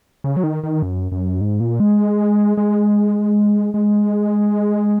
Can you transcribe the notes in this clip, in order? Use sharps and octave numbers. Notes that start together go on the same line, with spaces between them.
C#3
F#3
D#3
D#3
F#2
F#2
G#2
A#2
G#3
G#3
G#3